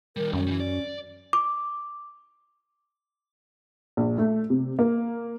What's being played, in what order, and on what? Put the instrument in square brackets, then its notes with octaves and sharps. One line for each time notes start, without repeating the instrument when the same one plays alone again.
[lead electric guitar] D#3 G3 [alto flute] A#4
[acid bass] F#2 [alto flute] C#4
[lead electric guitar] E3 G3
D5
[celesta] D6
[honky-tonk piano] A#1
A3
C3
A#3